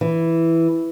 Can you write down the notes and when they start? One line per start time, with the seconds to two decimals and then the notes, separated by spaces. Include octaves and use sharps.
0.01 E3